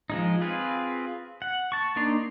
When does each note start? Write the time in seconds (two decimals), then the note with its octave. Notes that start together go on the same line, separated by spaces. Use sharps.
0.10 F3 G#3 D#4
0.41 C4 F4 G#4 B4
1.42 F#5
1.72 A5 C#6
1.96 A#3 D4 D#4 A#5 C6